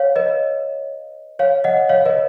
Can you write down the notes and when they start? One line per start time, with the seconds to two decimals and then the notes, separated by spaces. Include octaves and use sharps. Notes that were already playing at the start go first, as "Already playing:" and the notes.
Already playing: C#5 F5
0.16 B4 D#5
1.39 C#5 F5
1.64 D#5 F#5
1.89 C#5 F5
2.06 B4 D#5